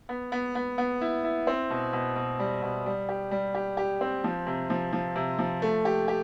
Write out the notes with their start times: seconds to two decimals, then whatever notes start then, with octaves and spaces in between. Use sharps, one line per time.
0.09 B3
0.32 B3
0.55 B3
0.78 B3
1.01 E4
1.24 E4
1.47 C4
1.70 B2
1.93 B2
2.16 B2
2.39 G3
2.62 B2
2.86 G3
3.09 G4
3.31 G3
3.55 G4
3.77 G4
4.01 C4
4.24 F3
4.47 C3
4.70 F3
4.93 F3
5.16 C3
5.39 F3
5.62 A3
5.85 G4
6.08 G4